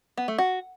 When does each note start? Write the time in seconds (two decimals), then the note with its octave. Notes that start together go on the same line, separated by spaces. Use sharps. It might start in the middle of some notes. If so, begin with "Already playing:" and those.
0.17 B3
0.28 A3
0.38 F#4